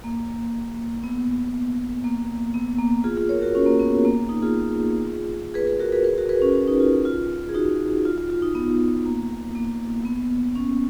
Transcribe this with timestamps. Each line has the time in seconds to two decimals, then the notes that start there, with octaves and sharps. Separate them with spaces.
0.04 A#3
1.04 B3
2.04 A#3
2.54 B3
2.79 A#3
3.04 F4 G#4
3.17 F4 G#4
3.29 A#4 C#5
3.42 F#4 A#4
3.55 C#4
3.66 A#3
3.80 B3
3.92 B3
4.05 A#3
4.29 D#4
4.42 F4 G#4
5.54 G#4 B4
5.67 G#4 B4
5.79 F#4 A#4
5.92 G#4 B4
6.04 G#4 B4
6.18 F#4 A#4
6.29 G#4 B4
6.42 C#4
6.55 C#4
6.68 D#4
6.80 F4
7.05 F4
7.49 G#4
7.55 D#4 F#4
8.05 F4
8.18 F4
8.30 F4
8.42 D#4
8.55 B3
9.06 A#3
9.55 A#3
10.05 B3
10.55 C#4